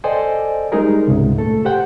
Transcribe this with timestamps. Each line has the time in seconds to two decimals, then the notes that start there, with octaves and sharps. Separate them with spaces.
0.04 A4 C5 D5 D#5 G5 G#5
0.72 G3 G#3 D#4 G4 G#4 A#4
1.07 C#2 G#2 C3
1.38 A#2 A3 A4
1.65 G4 C5 F#5 G5